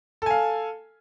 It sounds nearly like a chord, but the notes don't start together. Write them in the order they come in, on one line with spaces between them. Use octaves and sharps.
A4 G#5 F5